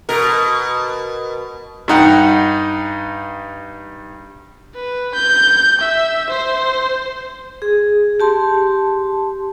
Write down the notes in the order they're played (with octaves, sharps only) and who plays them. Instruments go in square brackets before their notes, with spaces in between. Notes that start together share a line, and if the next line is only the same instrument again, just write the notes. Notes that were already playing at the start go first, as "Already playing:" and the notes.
[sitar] B2 A#4
[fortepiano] G2 D#4 F#5 G5
[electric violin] B4
G6
E5
C5
[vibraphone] G#4
G4 A5 C6